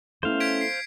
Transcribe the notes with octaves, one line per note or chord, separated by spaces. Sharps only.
A3 B3 C#4 E4 C5 F5
G#6 B6 D7
C7